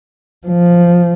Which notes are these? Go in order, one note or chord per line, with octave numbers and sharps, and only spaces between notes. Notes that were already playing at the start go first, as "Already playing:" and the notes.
F3